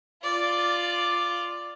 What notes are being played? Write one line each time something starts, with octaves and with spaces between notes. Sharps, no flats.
F4 D5